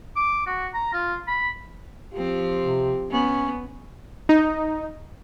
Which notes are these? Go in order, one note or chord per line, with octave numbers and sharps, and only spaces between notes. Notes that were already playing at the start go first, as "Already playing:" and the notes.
D6
F#4
A#5
F4
B5
F3 C4 G4
C3
B3 C#4
D#4